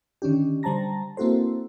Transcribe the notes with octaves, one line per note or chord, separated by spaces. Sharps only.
D3 D#3 C#4 D4 G4
D3 G3 C5 A5 A#5 A#6
A#3 C4 E4 F#4 A4 C5